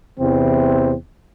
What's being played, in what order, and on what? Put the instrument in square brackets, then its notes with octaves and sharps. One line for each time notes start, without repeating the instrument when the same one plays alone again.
[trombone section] E2 C3 E3 C4